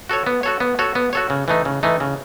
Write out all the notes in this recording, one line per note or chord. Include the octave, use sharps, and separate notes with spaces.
F#4 A4 C#5
B3
F#4 A4 C#5
B3
F#4 A4 C#5
B3
F#4 A4 C#5
C#3
E3 A3 D#4
C#3
E3 A3 D#4
C#3